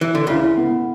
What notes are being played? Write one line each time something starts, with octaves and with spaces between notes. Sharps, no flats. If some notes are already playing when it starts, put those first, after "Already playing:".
E3
D3
C#2 C#3 E4
B3